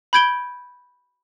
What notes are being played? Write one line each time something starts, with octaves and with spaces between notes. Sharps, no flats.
B5 G6 G#6 D7 G7